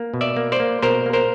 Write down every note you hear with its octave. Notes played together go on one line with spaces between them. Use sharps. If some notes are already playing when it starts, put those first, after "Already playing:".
Already playing: A#3
B2
D5 E5
A#3
C5 D5
A#3
B2 A#4 C5
A#3
A#4 C5